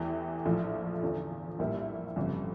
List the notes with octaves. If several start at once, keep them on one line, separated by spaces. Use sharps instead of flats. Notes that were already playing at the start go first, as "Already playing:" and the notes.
Already playing: E2 E3 A3 E4 G4
A#1 A2 F3 A3 E4
E2 D3 F3
A#1 A2 G3 A#3 E4
G1 F2 C#3 G3